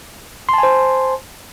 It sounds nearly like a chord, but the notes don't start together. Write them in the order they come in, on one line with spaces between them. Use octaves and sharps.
C6 A5 G#5 C5